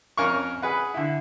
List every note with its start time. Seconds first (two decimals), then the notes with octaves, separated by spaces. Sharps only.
0.17 F2 C#4 A#4 F5 C#6
0.62 G#4 B4 F#5
0.94 D3 E4